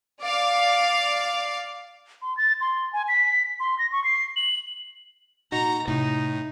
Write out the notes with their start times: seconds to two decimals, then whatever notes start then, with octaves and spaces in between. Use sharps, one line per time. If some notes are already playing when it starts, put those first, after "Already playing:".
0.22 D5 F5
2.22 C6
2.37 A6
2.61 C6
2.93 G#5
3.08 B6
3.60 C6
3.79 A#6
3.92 C#6
4.04 C7
4.36 F#7
5.52 A#2 D#4 F#4 A#5
5.88 A2 C3 D#4 E4